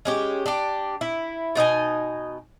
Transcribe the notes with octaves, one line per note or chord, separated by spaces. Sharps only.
G#3 C#4 G4
D4 G4
E4
B2 D#4 D#5 G#5